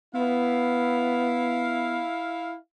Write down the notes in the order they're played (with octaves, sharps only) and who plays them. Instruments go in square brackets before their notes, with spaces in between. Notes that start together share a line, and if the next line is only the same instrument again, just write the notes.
[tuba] B3 [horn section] E4 F5